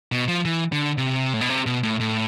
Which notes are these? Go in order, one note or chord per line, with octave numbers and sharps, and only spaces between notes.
B2
F3
E3
D3
C3
A2
B2
C3
B2
A2
A2